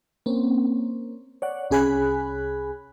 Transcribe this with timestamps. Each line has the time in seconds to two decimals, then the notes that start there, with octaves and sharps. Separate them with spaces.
0.26 A#3 C4 C#4
1.42 C#5 D5 F#5
1.71 C2 C#4 G#4 G#5 B5 F#6